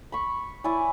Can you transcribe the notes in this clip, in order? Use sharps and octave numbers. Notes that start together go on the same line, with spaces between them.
B5 C#6
E4 C#5 D5 G#5